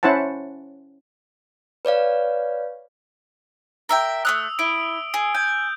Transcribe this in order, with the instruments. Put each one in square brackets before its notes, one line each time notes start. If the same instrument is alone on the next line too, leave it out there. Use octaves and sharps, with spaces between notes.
[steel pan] C#4 E4 C5 F#5 A5
[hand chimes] B4 C#5 D5 F5
[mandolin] A#4 E5 G5
[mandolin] A3 B3 F#6 [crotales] D#6 E6
[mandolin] E4 [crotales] D7 G7
[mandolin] G#4
[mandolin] G#5 [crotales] G6